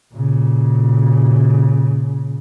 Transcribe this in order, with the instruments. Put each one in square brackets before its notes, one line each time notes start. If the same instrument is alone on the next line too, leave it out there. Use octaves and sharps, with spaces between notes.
[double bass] A#2 C#3